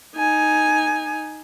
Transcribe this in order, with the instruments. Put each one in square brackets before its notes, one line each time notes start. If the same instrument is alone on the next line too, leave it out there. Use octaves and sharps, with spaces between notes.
[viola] D#4 G#5